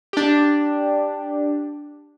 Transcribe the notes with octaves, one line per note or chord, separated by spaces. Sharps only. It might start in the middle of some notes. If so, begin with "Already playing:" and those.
D4 G4